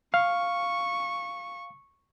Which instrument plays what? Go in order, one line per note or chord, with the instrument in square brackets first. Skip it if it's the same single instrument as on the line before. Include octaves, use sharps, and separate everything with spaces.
[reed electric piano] F5 [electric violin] C#6